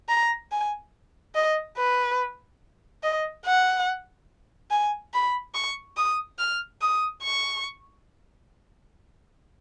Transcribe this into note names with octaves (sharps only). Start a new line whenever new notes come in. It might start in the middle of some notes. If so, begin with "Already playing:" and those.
A#5
G#5
D#5
B4
D#5
F#5
G#5
B5
C#6
D#6
F6
D#6
C#6